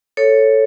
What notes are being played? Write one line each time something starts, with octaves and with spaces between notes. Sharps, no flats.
A4 C#5